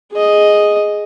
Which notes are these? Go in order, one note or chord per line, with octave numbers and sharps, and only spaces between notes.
G#4 D#5